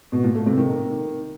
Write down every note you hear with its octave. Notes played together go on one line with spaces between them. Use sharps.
B2
A#2
A3
C3
D#3